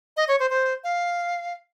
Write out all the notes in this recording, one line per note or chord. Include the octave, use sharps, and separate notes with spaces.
D#5
C#5
C5
C5
F5